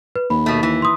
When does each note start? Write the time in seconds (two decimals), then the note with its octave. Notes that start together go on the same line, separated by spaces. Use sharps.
0.16 B4
0.30 D#2 B5
0.46 B2 A3
0.63 E3
0.82 C6 D#6